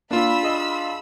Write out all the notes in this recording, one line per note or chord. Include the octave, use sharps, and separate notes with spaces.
A#3 D4 F4 B5 E6
G#4 D#5